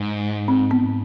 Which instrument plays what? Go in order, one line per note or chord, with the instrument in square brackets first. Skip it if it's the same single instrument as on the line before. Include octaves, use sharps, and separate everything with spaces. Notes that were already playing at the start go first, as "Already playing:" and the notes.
Already playing: [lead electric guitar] G#2
[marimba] C4
B3